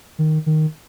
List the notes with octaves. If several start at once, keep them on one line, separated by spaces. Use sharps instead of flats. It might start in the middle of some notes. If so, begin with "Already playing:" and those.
D#3
D#3